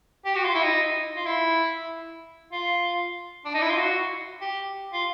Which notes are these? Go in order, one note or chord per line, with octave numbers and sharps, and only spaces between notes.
G4
F#4
F4
E4
D#4
F4
E4
F4
D4
D#4
E4
F4
F#4
G4
F4